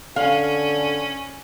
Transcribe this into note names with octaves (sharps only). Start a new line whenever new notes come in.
D3 C#4 F5